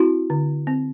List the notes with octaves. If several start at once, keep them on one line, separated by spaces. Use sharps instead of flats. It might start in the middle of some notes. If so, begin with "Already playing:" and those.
Already playing: C4 E4 F#4
D3
C4